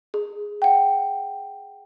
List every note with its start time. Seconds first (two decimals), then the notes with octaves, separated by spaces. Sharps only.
0.14 G#4
0.62 F#5 G5